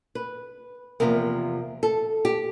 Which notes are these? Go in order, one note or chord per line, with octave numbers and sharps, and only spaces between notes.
B4
E2 C3 F3 A#3 A#4
A4
G4